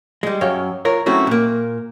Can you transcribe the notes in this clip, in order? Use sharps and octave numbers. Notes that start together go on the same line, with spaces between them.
G3 G#3
F#2 C#5 F5 G5
F4 A#4 C#5
F#3 A3 C4 C#4 E4 F#4
A#2 A#3